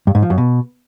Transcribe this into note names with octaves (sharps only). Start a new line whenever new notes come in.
G2
G#2
F3
F#2
B2